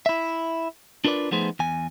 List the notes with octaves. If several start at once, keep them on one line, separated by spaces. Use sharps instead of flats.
E4 E5
D4 F4 A#4 B4 D5
F3 A3 B3 D#4 G#4 C5
E2 G#5